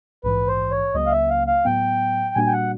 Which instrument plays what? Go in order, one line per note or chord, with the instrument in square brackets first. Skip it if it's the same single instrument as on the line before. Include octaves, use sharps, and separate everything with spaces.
[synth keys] A#1 G#2 E3 [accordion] B4
[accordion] C5
C#5
[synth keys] C#2 C#3 F#3 A#3 [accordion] D#5
[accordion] F5
E5
F5
F5
[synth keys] A2 F#3 B3 [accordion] G5
[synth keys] A#2 G3 A#3 D4 F#4 [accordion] G#5
[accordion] G5
F#5